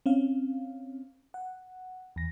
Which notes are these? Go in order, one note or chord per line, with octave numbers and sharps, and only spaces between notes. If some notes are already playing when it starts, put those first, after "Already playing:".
C4 C#4 F5
F#5
E2 A#6